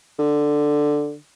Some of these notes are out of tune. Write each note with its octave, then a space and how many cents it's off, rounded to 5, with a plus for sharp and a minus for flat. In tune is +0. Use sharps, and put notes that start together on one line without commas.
D3 +5